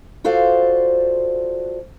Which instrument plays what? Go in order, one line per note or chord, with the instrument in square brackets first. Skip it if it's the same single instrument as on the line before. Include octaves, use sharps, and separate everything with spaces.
[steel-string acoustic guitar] F4 F#4 A4 C5 D5 F5